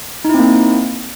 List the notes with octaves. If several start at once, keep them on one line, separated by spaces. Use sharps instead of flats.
A#3 C4 D#4 E4